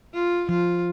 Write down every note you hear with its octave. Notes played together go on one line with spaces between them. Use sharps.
F4
F3 F4